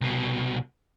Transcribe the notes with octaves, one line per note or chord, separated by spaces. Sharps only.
C2 B2